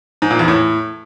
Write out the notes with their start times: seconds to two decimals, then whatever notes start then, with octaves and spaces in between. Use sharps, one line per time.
0.22 G#2
0.31 A#2
0.39 E2
0.48 A2